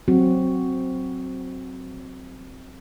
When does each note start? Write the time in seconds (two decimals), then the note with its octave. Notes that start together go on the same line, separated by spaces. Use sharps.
0.08 F#3 C4 F#4